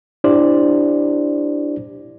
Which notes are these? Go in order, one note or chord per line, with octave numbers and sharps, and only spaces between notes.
D4 E4 G4 C5 D5